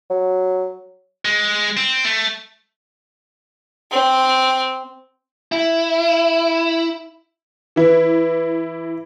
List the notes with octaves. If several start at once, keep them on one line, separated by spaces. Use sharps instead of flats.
F#3
G#3
C4
A3
C4
E4
E3 E4